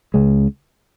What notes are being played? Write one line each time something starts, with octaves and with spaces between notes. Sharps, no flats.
C#2 C#3 G#3